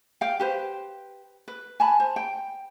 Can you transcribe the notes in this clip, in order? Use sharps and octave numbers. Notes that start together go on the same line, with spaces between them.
F5 G5
G4 B4 C5
B4
G#5 A5 B5
C5
G5